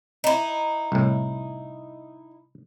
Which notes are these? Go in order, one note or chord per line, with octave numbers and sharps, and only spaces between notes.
D#4 E4
C2 A2